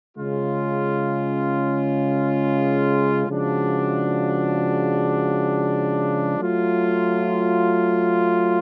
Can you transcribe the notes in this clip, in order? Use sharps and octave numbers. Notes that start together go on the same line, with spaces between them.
C#3 G#3 C#4 F4
C#3 F3 G#3 D4 F#4
F#3 A3 F4